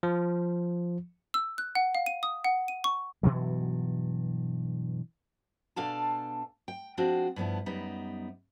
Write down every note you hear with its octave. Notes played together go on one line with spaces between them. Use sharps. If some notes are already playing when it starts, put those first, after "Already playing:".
F3
E6
F#6
F#5
F5
D#7
D#6
F#5
D#7
C#6
G2 B2 E3 F#3
B2 D4 A4 F5 G#5 A5
G5
F3 G#3 C4 D4 F4 F#4
G2 F3 B3 E4
F#2 G3 B3 D#4